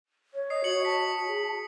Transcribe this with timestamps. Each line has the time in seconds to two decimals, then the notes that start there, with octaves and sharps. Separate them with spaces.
0.34 C#5
0.50 D#5 D#6 C7
0.64 F#4 C#5 C#7 F#7
0.85 A5 B6
1.27 G#4